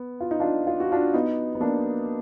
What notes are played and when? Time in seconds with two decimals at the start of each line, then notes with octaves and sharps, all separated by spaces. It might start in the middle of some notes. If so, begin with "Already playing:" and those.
Already playing: B3
0.20 F4
0.31 D#4
0.40 D4 F4
0.67 F4
0.80 F#4
0.92 D4 F4
1.14 B3 D#4
1.55 B3
1.60 A#3 D4